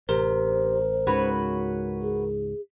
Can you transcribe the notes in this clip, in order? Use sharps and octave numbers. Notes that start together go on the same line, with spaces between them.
A1 C3 A#4 C5
C#2 G#2 C#3 F#4 B4 C#5
G#4